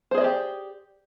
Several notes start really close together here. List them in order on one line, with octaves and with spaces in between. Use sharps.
C5 G#4 D#5 D5 G4